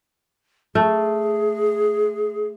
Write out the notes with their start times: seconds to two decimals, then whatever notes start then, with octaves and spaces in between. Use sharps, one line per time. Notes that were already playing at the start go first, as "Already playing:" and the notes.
0.75 A3 G#4